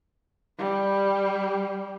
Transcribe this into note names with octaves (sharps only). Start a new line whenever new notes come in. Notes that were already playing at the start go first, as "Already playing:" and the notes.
G3